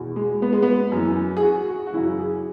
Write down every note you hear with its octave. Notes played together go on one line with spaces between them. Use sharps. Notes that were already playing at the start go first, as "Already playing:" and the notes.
Already playing: E2 B2
G#3
B3
G#3
B3
F#2
E3
G#4
F#4
F#4
F#4
F#2 C#3 E3 E4
G#4